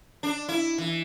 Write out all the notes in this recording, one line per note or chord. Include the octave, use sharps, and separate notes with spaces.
D4
E4
E3